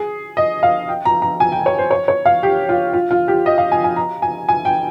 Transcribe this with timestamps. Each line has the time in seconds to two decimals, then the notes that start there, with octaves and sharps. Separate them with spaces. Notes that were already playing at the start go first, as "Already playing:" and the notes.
Already playing: G#4
0.37 D#5
0.63 F5
0.89 G5
1.05 A#5
1.22 A#5
1.40 G#5
1.52 G5
1.66 C#5
1.78 C5
1.91 C#5
2.08 C#5
2.26 F5
2.43 G4
2.69 F4
2.93 F4
3.11 F4
3.28 G4
3.46 D#5
3.58 F5
3.72 G#5
3.84 G#5
3.96 A#5
4.22 G#5
4.49 G#5
4.65 G5